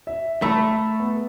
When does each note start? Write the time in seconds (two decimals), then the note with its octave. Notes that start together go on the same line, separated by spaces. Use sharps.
0.07 E5
0.42 A3 A#5 B5 E6
1.00 B3